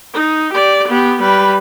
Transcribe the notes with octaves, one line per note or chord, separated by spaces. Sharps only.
D#4
G4 D5
B3 G4
G3 B4